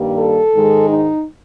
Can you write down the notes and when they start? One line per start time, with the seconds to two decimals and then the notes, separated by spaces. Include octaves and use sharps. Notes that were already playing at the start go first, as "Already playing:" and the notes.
Already playing: G2 D#3 G3 A#3
0.19 A4
0.54 G#2 D#3 G#3
0.89 D#4